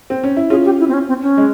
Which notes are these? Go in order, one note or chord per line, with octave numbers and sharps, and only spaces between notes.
C4
C#4
E4
C#4 F4 G#4
G4
E4
C4
C#4
C4
C#4
G#3